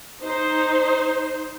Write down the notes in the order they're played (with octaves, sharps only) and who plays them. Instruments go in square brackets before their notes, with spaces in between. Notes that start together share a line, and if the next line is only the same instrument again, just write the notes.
[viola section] D#4 C5